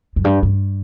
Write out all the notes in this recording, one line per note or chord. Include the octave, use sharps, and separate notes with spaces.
F#2
G2
G2